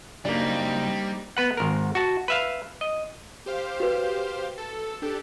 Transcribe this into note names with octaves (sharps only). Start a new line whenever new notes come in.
C#3 F#3 G3 A#3 C4 D4 D#4
B3 B4 F#5
G#1 A#4
F#4 A5
B4 E5 F5
D#5
G4 C5 F5
F#4 B4
A4
D4 G4 A4